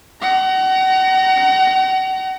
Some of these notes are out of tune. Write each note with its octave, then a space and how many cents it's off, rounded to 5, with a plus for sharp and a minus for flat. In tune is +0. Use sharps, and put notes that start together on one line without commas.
F#5 +35 A#5 +0